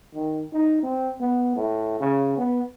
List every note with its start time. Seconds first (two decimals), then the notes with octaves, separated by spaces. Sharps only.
0.15 D#3
0.53 D#4
0.83 C4
1.21 B3
1.56 A2
2.00 C#3
2.37 B3